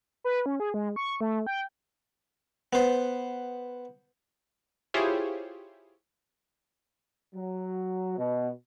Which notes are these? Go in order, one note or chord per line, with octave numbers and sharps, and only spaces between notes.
B4
C#4
G#4
G#3
C#6
A3
G5
B3 C5
E4 F4 G4 G#4 C5 C#5
F#3
B2